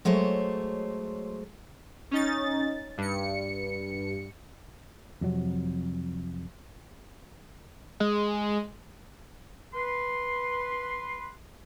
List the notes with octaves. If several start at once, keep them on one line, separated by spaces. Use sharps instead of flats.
F#3 G#3 A3 C5 C#5
C#4 D#4 A6
G2 C#7
F2 C3 F#3
G#3
B4 C6